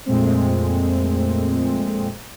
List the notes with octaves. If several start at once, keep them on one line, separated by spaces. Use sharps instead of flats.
F2 A#2 G#3 A3 C4